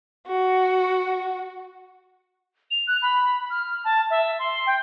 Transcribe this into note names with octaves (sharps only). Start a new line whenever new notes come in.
F#4
F7
F#6
B5
F6
A5
E5
C6
G5